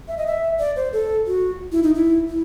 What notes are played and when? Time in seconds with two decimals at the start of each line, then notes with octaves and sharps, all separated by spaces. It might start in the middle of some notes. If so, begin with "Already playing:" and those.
0.08 E5
0.17 D#5
0.27 E5
0.59 D5
0.76 C5
0.93 A4
1.27 F#4
1.72 E4
1.83 D#4
1.95 E4
2.28 E4